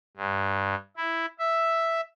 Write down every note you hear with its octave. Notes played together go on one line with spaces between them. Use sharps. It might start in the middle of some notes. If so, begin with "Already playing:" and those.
G2
E4
E5